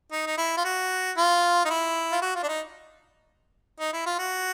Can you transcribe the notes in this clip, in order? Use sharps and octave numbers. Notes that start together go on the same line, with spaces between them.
D#4
D#4
E4
F4
F#4
F4
D#4
E4
F4
F#4
F4
D4
D#4
D#4
E4
F4
F#4